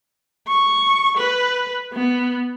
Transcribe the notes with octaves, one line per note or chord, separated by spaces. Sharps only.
C#6
B4
B3